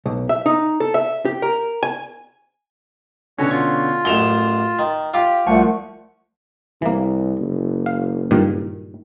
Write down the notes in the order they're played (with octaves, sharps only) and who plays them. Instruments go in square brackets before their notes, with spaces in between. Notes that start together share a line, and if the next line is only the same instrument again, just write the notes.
[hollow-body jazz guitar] B1
E5
D#4
A4
E5
G4
A#4
G#5
[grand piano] B2 D3 C#4 [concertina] F#4 C#5
[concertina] F4 [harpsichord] C#6
[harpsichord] A1 F#2 [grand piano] E7 F7 G7
[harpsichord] D#3
[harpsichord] F4 F5 G5 [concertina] G4 [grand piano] D6
[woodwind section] C2 A3 F#5 [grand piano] F3 [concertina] C#6
[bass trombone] C2 [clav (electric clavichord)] E3 A#3
[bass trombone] F#1
[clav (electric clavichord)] F5
G2 A#2 D#3